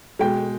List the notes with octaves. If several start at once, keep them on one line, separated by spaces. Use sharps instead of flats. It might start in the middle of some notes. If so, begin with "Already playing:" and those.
B2 G#3 G5